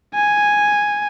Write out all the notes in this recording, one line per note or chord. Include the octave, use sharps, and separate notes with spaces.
G#5